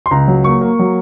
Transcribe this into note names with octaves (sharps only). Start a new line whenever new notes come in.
C6
C#2 A#5
F#3
A#3 C#6
A#3
F#3